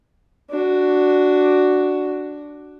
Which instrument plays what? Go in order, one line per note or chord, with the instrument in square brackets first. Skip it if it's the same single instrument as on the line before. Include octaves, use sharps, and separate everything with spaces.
[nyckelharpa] D4 F#4